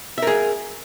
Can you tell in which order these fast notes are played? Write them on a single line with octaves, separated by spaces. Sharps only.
E5 A#4 G#4